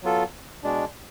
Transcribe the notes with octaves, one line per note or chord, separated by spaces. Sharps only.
F#3 B3 F4 A4
B2 G#3 D4